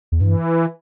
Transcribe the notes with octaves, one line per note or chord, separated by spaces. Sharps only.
E2
G2 E3